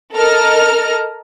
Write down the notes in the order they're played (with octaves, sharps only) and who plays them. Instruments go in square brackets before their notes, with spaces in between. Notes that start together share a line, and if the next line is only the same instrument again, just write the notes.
[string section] A4 A#4 D#5 A#5 F6